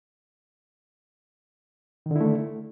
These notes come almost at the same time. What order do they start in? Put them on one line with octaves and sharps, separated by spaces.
D#3 D3 E4 A3